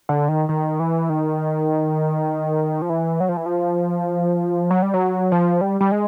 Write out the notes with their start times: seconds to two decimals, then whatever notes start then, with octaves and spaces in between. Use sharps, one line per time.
0.09 D3
0.29 D#3
0.49 D#3
0.80 E3
1.10 D#3
2.82 F3
2.90 E3
3.20 F#3
3.29 F3
3.37 E3
3.46 F3
4.71 F#3
4.82 G3
4.94 F#3
5.32 F3
5.61 G3
5.81 G3
5.92 G#3